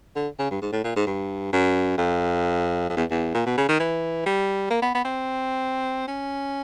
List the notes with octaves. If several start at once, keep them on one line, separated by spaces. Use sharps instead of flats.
D3
C#3
G2
G#2
A2
A#2
G#2
G2
F#2
F2
F2
E2
E2
A#2
B2
C#3
D#3
E3
G3
A#3
B3
B3
C4
C#4